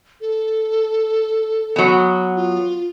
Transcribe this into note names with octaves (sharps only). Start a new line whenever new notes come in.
A4
F#3 B3
F4